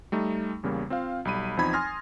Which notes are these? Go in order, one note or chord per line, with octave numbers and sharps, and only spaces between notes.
G3 A3 D#4
E2 C#3 G3 A#3
C4 F4 C5 F5
B1 G3 B5 D#7
E2 F3 C4 D#4 B5 G#6
G#5 C6 D#6 F6 A6 A#6